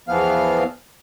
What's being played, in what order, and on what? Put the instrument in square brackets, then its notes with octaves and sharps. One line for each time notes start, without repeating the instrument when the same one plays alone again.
[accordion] E2 E3 F3 B3 F5 F6